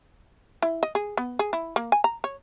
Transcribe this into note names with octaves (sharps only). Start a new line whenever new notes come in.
E4
D#5
G#4
B3
G#4
E4
A#3
G#5
A#5
C#5